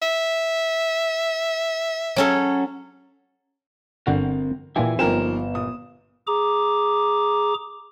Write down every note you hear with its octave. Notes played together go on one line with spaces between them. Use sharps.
E5
F#3 C#4 A4
G1 D3 C4 F#4 A#4
A#2 E3 F4 G4 E5 G#5
G1 F3 A#3 C4 D#4 A#4 G#5 E7
A#2 D#6
G#4 A#5 D6